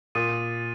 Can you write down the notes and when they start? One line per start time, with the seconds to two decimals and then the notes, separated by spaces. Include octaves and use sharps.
0.15 A#2 D#6 A6 D#7